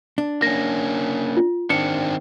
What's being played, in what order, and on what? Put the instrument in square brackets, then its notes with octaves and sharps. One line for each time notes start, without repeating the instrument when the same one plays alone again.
[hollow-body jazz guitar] D4
[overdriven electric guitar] A#3 C#4 [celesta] A#6
[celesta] F4
[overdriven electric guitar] D#3 C4 [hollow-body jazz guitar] D4 [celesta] C#7